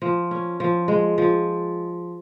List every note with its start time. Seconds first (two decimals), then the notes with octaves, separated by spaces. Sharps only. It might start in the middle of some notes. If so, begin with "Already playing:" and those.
0.02 F3
0.31 C#4
0.60 F3
0.88 G#3
1.18 F3